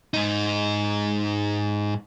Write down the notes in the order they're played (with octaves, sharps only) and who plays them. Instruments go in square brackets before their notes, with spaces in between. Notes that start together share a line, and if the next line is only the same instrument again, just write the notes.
[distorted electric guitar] G#2 D#4